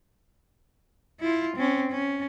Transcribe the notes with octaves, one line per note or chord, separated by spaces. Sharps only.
E4 F4
C4 C#4
C#4